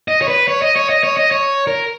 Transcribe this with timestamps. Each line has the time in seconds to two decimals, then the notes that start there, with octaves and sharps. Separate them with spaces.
0.08 D#5
0.22 C#5
0.28 B4
0.48 C#5
0.62 D#5
0.76 C#5
0.89 D#5
1.04 C#5
1.17 D#5
1.31 C#5
1.67 A#4